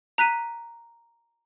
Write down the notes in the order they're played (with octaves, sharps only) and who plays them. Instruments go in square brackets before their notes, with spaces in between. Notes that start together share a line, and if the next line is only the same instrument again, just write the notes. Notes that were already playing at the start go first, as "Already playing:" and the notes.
[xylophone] A#5 F#6 B6 D#7